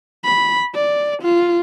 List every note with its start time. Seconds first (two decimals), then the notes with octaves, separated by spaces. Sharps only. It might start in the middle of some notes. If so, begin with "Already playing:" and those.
0.24 B5
0.75 D5
1.22 F4